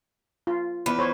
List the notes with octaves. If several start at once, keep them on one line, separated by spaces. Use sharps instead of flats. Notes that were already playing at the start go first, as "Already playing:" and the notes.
F4
E2 B4
C5 C#5